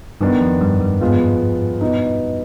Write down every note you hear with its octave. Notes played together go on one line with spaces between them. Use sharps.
G2 D#3 B3 D4
F2
G2
G2
G#2 F3 G#3 B3 F4
B2 B3 D#4 B4